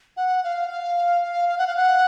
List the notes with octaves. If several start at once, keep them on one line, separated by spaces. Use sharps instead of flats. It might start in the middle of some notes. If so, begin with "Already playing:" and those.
F#5
F5
F5
F5
F5
F#5
F5
F#5